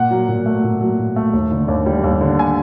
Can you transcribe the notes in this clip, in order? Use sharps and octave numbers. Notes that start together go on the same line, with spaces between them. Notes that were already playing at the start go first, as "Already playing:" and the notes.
Already playing: A#2 F#5
F#3
A#2
A3
A#2
F#3
A#2
A3
D#2
D3
D#2
G3
D#2
D3
G#5